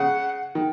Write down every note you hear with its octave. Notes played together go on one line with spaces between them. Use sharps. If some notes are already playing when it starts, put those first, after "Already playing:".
Already playing: C#3 F#5
D#3